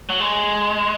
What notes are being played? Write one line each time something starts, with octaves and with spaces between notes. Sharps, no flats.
F#3
G#3